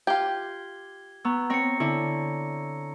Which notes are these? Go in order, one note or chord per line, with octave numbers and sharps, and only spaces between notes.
F4 G4 G#6 G7
B3 A#5 C#6 E6
C4 C#5 A#6 C#7
D3 E4 C#5